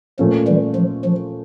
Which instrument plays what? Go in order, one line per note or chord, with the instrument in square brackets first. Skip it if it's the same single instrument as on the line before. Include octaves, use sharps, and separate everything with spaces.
[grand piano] A#2 A3 C#4 F4 [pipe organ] F3
[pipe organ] E3 G3
F3
F3